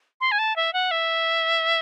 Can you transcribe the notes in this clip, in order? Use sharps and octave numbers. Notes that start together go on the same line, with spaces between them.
C6
G#5
A5
E5
F#5
E5